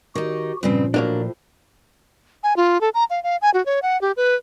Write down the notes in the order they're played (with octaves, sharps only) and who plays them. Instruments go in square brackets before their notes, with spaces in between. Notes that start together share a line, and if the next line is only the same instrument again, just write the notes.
[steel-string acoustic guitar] D#3 D#4 [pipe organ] F#4 G4
[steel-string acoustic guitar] G2 C#3 C4 [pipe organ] A#2 F3
[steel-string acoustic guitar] A2 [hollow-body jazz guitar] F#3 A#3 D4
[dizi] G#5
F4
A4
A#5
F5
F5
G#5
F#4
C#5
F#5
G4
B4